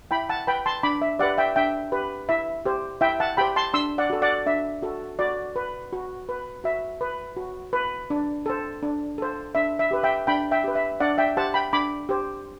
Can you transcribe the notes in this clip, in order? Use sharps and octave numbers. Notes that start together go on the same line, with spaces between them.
E4 G5 B5
F#5 A5
B4 G5 B5
A5 C6
D4 B5 D6
E5
G4 B4 D5 F#5
E5 G5
D4 E5 G5
G4 B4
E4 E5
G4 C5
E4 E5 G5
F#5 A5
G4 C5 G5 B5
A5 C6
D4 C6 E6
D5 F#5
F#4 A4
D5 F#5
D4 E5
F#4 A4
F#4 D5
B4
F#4
B4
F#4 E5
B4
F#4
B4
D4
A4 C5
D4
A4 C5
D4 E5
E5
G4 B4
E5 G5
D4 G5 B5
E5 G5
G4 B4
E5
D4 D5 F#5
E5 G5
G4 C5 F#5 A5
G5 B5
D4 B5 D6
G4 C5